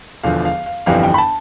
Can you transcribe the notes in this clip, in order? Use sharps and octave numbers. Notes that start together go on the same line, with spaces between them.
E1 E2 D3 F3 F5
F5
F5
G1 F2 E3 G3 F5
G5
B5
A5